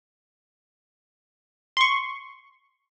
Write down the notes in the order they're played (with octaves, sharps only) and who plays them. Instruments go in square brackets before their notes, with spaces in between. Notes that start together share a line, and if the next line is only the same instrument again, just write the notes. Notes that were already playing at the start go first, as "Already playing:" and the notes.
[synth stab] C6 C#6